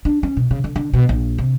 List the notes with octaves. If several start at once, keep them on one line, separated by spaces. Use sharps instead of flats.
D4
C#4
B2
C#3
D3
D3
B2
A#1
C3